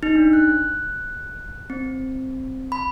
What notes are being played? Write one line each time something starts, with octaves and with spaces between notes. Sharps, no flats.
D#4
D4
F#6
C4
B5